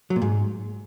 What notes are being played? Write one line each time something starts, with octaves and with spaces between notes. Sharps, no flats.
F#3
A#2
G#2